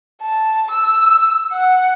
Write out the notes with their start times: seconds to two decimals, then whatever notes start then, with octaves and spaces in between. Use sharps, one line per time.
0.22 A5
0.71 E6
1.52 F#5